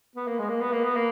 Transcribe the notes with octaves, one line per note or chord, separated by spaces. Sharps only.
B3
A#3
G#3
A#3
B3
A#3
B3
A#3